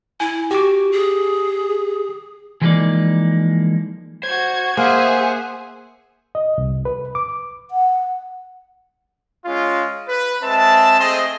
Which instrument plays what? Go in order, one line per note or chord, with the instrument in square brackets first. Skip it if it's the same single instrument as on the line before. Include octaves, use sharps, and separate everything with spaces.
[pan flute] E4 [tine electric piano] G#5
[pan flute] F#4 [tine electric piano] G4 D6
[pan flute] G#4
[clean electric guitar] E3 F3 G#3 A#3 D#4 D5
[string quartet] F#4 G#6 [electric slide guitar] C5
[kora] A#3 [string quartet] G#4 E5 [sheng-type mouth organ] C5 F#5 [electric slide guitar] G#5
[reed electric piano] D#5
C2
B4
D6
[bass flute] F#5
[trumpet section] G#3 C#4 F4
B4
G#3 C4 E5 A5
A3 C4 G#4 D#5 C6